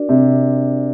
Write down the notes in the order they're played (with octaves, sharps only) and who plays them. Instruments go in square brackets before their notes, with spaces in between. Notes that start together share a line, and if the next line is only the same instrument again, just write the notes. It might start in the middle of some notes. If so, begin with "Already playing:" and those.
Already playing: [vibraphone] D4 F#4 A#4 D5
[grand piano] C3